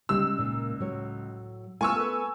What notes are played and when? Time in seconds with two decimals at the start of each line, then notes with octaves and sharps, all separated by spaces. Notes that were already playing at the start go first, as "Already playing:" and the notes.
0.09 C#2 G3 D#4 E6
0.38 A#2 A#3 D#4
0.79 A2 F#3 C#5
1.81 A3 B3 F4 A4 G#5 C#6 E6
1.96 A4 B4